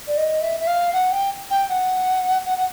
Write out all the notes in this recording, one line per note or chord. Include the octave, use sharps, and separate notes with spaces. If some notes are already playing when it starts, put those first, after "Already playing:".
D5
D#5
E5
E5
F5
F#5
G5
G5
F#5
F#5
F#5